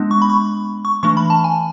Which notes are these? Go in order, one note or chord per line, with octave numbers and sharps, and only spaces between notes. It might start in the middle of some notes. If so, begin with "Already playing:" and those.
Already playing: G#3 B3 D4
C#6
B5
C#6
C#6
E3 A3 D4 C#6
B5
A5
G#5